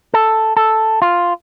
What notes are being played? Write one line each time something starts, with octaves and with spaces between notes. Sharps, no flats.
A4
A4
F4